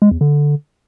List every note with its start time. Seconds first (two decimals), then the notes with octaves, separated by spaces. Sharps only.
0.02 G#3
0.11 E2
0.21 D3